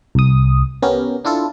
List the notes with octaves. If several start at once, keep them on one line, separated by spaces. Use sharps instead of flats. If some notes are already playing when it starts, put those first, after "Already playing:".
C2 D#6
B3 C#4 G4 A#4
D4 E4 F4 A4